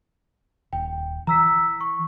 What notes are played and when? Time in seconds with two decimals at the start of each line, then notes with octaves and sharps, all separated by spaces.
0.73 D#1 G5
1.27 E3 A#5 E6 B6
1.80 C#6